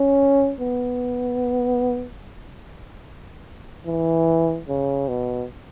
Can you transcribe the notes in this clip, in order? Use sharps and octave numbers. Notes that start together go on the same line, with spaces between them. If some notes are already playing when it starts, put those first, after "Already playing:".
Already playing: C#4
B3
E3
C#3
B2